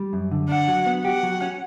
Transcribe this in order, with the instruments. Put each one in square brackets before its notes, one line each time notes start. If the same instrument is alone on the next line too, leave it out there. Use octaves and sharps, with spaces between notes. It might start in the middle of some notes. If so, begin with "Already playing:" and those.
Already playing: [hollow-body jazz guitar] G3
F#2
D3
[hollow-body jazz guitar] D4 [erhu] F#5
[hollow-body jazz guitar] F#3
B3
[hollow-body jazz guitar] G4 [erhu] F#5
[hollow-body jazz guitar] F#3
C#4